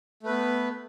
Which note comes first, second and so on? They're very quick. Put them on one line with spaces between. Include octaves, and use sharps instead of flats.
A3 B4 B3